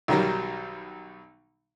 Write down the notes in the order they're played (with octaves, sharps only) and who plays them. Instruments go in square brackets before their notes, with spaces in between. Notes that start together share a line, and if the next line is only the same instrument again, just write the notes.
[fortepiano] B1 D#3 F#3 G3